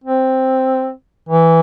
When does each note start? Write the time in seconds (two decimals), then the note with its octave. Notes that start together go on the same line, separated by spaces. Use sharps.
0.04 C4
1.29 E3